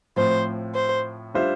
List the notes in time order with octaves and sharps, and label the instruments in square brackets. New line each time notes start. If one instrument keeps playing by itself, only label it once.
[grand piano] A2 F3 C4 [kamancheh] C5
[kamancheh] C5
[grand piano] G3 D4 F4 C5 E5